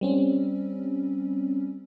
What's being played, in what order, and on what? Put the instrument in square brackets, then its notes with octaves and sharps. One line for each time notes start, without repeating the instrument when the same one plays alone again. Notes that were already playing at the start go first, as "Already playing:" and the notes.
[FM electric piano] G3 C4 C#4